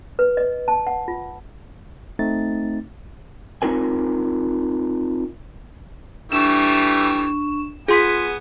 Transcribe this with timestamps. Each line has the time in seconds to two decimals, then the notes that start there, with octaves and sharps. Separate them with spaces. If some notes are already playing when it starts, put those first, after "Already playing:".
0.19 B4
0.37 D#5
0.68 A5
0.87 F#5
1.08 F4
2.19 A3 C4 D#4 A6
3.62 C4 C#4 D#4 F4 A#4 G#5
6.32 E3 G3 A3 D4 C#6 E7
7.88 B3 F4 G#4 G#5 C6 B6